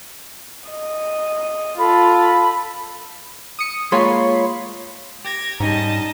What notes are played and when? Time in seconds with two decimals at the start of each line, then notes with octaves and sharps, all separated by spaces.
0.69 D#5
1.78 F4 A4 B5
3.59 D#6 C#7
3.92 G#3 A#3 F4 C#5 B5 C6
5.25 G4 G#6 A#6
5.60 G#2 G3 C#4 D#4 D#5 A5